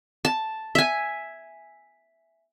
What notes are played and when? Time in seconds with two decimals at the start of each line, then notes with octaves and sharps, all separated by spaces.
0.25 A5
0.75 E5 G#5